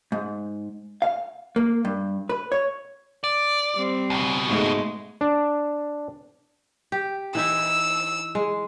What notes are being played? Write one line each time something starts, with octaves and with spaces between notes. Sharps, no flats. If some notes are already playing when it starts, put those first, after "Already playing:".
G#2
F5
A#3
G2
B4
C#5
D5
G3 C4
C#2 B2
G#2 G#3 A3
D4
G4
E3 D#4 E4 E6
G#3